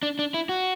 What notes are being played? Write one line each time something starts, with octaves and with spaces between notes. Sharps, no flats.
D4
D4
E4
F#4